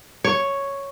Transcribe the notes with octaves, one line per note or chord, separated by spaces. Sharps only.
C#5